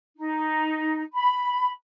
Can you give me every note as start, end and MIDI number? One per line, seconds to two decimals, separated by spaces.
0.18 1.02 63
1.13 1.71 83